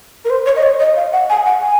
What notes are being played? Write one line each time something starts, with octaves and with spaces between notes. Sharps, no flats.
A#4
C5
C#5
D#5
C#5
D#5
F5
F#5
G#5
F#5
G#5